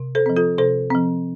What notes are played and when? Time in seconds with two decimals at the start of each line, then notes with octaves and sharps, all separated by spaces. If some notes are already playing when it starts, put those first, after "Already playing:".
Already playing: C3
0.15 A4 C5
0.26 F3 C4
0.36 F4 A4
0.58 C3 A4 C5
0.91 F3 C4